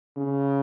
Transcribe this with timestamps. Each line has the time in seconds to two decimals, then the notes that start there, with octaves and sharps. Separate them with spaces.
0.17 C#3